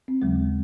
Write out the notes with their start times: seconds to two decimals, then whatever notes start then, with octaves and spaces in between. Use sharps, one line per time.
0.08 C4
0.22 D#2 C#3 F#3 G#3